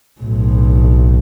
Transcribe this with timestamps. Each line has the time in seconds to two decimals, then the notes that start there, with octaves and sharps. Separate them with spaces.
0.21 B1 A2